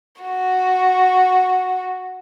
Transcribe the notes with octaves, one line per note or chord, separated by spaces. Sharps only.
F#4